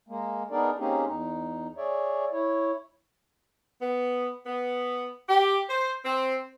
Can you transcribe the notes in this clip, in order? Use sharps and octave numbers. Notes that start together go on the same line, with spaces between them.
G#3 A#3
B3 D4 D#4 G#4 A#4 D5
A#3 C4 C#4 D#4 G4 G#4
E2 D#4
G#4 C#5 D5 E5
E4 C#5
B3
B3
G4
C5
C4